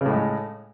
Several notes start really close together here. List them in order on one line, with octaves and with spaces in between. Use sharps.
C#3 A2 G#3